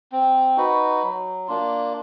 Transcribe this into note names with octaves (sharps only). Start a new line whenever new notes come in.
C4
D#4 F#4 B4
F#3
A#3 D4 F4